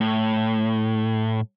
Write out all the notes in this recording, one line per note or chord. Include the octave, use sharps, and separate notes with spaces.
A2